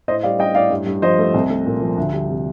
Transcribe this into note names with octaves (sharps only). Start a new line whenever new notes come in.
A2 C5 D#5
G3 D5 F5
G3 D#5 G5
A2 D5 F5
G2
G2
F3 C5 D#5
A3
C2
A3
A#2
F3
D2
G3
C3